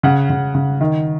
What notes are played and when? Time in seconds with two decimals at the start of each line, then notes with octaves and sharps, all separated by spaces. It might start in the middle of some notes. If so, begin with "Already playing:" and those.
0.03 C#3 F#5
0.30 C#3
0.55 C#3
0.81 D#3